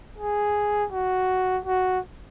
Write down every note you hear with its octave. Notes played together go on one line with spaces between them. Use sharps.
G#4
F#4
F#4